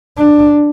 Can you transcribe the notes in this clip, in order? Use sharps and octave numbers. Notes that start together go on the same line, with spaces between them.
D4